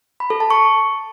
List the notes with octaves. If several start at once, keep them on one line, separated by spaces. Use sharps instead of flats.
B5
A4
A5
C#6